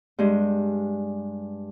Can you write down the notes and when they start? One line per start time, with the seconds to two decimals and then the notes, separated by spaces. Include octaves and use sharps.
0.19 G2 G#3